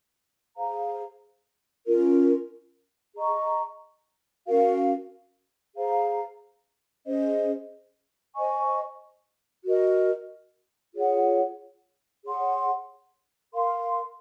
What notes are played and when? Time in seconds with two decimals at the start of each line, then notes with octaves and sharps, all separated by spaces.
0.56 G#4 C5 F5 A#5
1.86 C#4 F4 A#4
3.16 G#4 D#5 A#5 C#6
4.46 C#4 F#4 A#4 F5
5.76 G#4 C5 F5 A#5
7.06 C#4 G#4 C5 D#5
8.35 C5 D#5 G#5 C#6
9.65 F#4 A#4 D#5
10.95 F4 G#4 C#5 F#5
12.25 G#4 C#5 F#5 C6
13.54 A#4 F5 C6